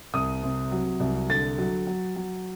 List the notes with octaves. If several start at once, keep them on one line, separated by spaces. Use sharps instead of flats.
C2 D#6
C3
F#3
C2
D3 A6
F#3
F#3
F#3